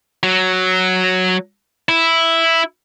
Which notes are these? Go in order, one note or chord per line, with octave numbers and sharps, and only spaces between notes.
F#3
E4